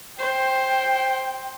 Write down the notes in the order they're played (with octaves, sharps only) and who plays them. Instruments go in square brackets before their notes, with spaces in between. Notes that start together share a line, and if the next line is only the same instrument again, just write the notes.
[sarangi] C5 [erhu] G5